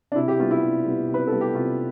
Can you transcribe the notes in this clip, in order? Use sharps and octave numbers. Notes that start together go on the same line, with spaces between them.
D4
C3 E4
G4
G3 B3 F4
E4
C3
G3 B3
C3
B4
G3 B3 A4
G4
C3 F4